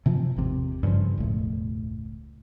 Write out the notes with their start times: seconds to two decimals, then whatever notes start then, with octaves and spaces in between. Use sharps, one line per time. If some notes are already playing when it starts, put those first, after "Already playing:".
0.06 C3 E3 F3
0.36 G#1 E2 C3
0.83 G2 C#3 E3 F3
1.18 E1 C#2 A2